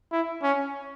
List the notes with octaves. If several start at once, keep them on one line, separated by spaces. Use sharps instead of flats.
E4
C#4